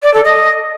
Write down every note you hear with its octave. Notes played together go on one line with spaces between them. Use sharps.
D5
A4
D#5